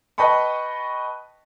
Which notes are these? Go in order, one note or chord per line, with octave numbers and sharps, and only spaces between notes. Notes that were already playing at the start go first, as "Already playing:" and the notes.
B4 D#5 G5 A5 B5 C#6